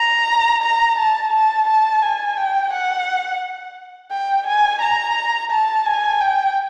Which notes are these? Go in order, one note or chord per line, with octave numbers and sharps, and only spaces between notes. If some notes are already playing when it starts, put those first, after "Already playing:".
Already playing: A#5
A#5
A5
A5
A5
G#5
G5
F#5
G5
G#5
A#5
A5
G#5
G5